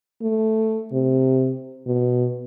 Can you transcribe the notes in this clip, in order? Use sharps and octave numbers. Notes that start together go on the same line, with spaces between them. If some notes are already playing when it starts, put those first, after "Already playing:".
A3
C3
B2